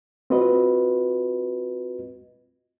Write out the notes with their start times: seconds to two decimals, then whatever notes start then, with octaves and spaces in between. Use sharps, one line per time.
0.30 C4 F4 F#4 B4 D#5